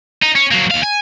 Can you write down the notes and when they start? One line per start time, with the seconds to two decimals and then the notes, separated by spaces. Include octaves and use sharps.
0.23 D#4
0.36 C#4
0.52 F#3 A#3
0.71 D#2 F5
0.83 G#5